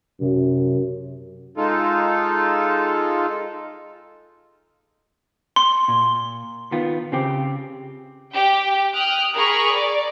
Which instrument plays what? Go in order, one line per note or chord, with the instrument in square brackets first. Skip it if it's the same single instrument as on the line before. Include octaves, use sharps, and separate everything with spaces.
[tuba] F#2 [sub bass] C3
[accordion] G#3 D#4 F4 A4
[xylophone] C6
[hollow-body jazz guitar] A#2
D#3 B3 F4
C#3 C4 G4
[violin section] G4 G5
G5 D#6 F6 F#6
G#4 A#4 B5 C#6
D5